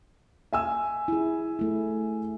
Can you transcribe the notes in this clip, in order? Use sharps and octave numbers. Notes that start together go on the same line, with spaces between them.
E5 G#5 E6
E4 G#4
A3 E4